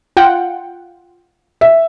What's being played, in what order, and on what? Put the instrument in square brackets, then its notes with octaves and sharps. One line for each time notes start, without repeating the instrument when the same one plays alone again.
[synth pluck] F4 F#5 G5
[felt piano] E5